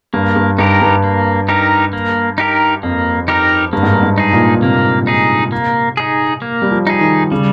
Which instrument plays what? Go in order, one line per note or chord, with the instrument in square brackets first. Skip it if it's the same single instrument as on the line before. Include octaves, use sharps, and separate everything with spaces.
[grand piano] G2 [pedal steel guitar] A#3
[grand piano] G2
[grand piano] G2 [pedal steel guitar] D#4 G4 A#4
[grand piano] G2
[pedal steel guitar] A#3
D#4 G4 A#4
A#3
D#4 G4 A#4
[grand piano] F2 [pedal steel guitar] A#3
[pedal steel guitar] D#4 G4 A#4
[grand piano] G2 [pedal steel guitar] A#3
[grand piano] G#2
G2
G#2
[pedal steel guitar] D#4 G#4
[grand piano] A#2
[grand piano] C3 [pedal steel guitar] A#3
[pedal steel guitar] D#4 G#4
A#3
D#4 G#4
A#3
[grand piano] G3
F3
[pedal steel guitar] D#4 G#4
[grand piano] D#3
[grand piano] C#3 [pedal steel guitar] G3